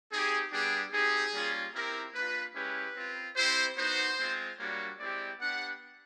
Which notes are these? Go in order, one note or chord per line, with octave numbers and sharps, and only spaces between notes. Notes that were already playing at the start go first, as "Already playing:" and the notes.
C4 D#4 G4 G#4
G3 B3 D4 G4 G#4
C4 D#4 G4 G#4
G3 A#3 C#4 F4
C4 E4 G4 A#4
A#3 D4 F4 B4
G#3 C#4 E4 G4 B4
C4 F4
C4 E4 G4 C5
B3 D#4 F#4 C5
G#3 C4 F4
G3 A#3 D4 F#4 C#5
G#3 C4 E4 G4 D5
B3 D4 G4 F#5